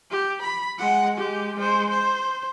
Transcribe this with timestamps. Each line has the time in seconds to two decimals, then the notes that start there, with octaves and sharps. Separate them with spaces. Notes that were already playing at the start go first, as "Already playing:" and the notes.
0.11 G4
0.42 B5
0.78 G#3 F#5
1.18 G#3 G4
1.57 G#3 C5
1.90 C5